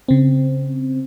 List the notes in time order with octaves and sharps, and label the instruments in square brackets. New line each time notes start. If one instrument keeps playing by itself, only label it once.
[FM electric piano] C#3 C4